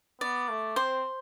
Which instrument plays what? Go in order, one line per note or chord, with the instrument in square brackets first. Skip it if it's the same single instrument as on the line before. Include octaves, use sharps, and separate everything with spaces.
[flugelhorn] B3 [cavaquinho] D5
[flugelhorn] A3
[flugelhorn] C4 [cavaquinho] C5